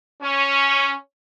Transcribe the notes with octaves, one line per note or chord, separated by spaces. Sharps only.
C#4